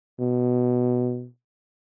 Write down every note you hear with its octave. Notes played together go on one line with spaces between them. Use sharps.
B2